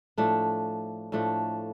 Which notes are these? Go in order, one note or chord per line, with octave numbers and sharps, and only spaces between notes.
A2 F3 A3 D4
A2 F3 A3 D4